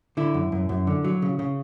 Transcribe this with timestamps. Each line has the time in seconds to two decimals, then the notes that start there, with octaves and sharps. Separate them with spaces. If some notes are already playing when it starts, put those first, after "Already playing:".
0.17 D3 E4
0.34 F#2
0.52 F#2
0.69 F#2
0.87 D3
1.04 F#3
1.22 C#3
1.39 C#3